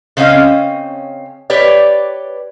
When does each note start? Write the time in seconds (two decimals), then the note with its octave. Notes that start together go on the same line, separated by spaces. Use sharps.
0.17 C#3 C4 C#4 D#5 F5
1.50 G4 B4 C#5 D5